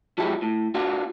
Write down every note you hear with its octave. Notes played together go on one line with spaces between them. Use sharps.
F3 F#3 G#3 D#4 E4 G4
A2
A#3 D4 F4 F#4